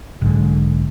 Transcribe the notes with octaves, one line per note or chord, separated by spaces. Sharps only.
B1 G#2 D3